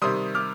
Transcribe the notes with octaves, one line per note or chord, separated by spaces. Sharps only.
C3 D#3 G3 C6 D#6
D6 F6